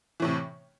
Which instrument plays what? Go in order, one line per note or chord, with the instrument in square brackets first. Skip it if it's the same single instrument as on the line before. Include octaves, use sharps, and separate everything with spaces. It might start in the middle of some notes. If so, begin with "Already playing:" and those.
[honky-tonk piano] E3
A2
C3